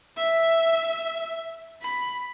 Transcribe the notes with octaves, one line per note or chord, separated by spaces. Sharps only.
E5
B5